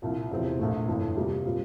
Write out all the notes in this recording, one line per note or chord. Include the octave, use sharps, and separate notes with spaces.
C2 A#2 F3
E1 E2 C3 F3 C4
A#1 A#2 A3
G1 F2 E3 A#3
C3 G3 A#3 F4
A#2 G3 C4 F4